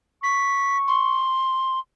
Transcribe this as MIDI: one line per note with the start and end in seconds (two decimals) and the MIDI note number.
0.23 1.31 85
0.23 0.77 95
0.87 1.79 84